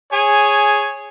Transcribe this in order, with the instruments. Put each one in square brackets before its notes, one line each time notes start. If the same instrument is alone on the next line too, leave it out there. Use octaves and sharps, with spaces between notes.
[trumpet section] G#4 C#5 G#5